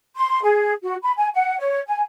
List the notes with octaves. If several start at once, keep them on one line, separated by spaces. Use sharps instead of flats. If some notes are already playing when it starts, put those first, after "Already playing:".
C6
G#4
F#4
B5
G#5
F#5
C#5
G#5